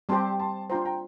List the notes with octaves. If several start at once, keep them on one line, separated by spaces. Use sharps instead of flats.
G3 C4 G4 C5 A5 C6
A5 C6
D4 F4 C5 G5 A#5
G5 A#5